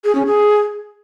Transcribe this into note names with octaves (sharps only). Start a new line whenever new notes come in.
G#4
C#4
G#4